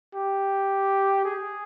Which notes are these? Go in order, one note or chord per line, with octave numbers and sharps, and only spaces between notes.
G4
G#4